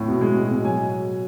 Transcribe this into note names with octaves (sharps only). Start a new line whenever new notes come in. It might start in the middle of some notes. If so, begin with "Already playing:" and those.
Already playing: A2
B2
G#3
B2
B2
F#3 G#5